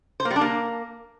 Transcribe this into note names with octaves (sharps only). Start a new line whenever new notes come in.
C5
A#3
G3
D4
A#3